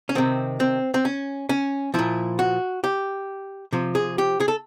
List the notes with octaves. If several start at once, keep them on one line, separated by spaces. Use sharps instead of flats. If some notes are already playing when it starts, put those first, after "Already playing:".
C#4
C3 D#3 C4
C4
C4
C#4
C#4
A#2 F3 E4
F#4
G4
C3 F3
G#4
G4
G#4
A4